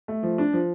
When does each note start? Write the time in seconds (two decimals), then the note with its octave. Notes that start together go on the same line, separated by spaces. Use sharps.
0.08 A3
0.23 F3
0.38 D4
0.53 F3